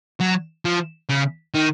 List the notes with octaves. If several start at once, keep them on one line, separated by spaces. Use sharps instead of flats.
F#3
F3
C#3
D#3